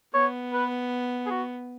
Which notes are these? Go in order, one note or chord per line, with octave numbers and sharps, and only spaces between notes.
B3 C#5
B4
G#4
F#4